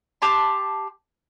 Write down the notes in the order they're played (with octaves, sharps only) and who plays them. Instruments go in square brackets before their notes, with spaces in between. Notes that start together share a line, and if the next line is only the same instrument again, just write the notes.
[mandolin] G4 A5 C6